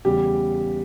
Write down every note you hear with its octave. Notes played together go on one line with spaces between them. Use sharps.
E2 C#3 G3 G4